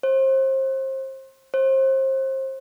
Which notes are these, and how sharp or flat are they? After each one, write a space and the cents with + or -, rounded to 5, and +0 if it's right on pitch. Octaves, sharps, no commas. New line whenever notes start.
C5 +30
C5 +30